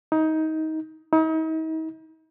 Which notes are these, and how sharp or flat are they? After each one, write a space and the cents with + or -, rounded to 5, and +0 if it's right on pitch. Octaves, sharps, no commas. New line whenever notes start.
D#4 +20
D#4 +40